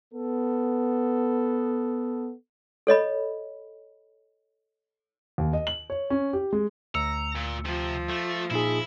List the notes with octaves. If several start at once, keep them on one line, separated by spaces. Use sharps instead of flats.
B3 A4
A4 C#5 D#5 B5
D#2
D#5
F#7
C#5
C#4
G4
G#3
D2 A#5 E6 C#7
A#2
C3 F3
A3
A#2 D#4 E4 G#4